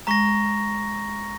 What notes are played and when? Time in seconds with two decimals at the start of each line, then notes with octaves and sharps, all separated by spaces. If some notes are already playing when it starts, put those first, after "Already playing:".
0.07 G#3 A#5 C#6 A#6